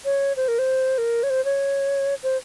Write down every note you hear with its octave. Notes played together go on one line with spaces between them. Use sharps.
C#5
C5
A#4
C5
A#4
C#5
C5
C#5
C5